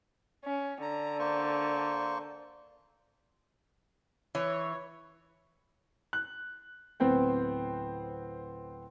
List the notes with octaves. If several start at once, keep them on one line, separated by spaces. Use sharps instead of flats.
C#4
D3 A#5
A#3 C5 C#6
E3 C#5
F#6
D1 B3 C4 C5 G5